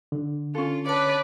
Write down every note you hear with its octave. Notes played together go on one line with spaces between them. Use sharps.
D3
C#4 F4 A4
B4 C#5 D5 A5